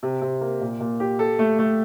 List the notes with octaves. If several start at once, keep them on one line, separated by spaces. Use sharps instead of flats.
C3
C3
A#3
A#2
A#2
G4
A4
A3
A3